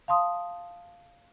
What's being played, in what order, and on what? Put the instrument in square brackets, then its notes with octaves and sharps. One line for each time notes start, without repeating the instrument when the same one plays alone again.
[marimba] F5 A5 C6 D#6